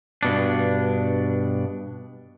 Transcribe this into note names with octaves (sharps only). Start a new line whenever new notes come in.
G2 B2 D4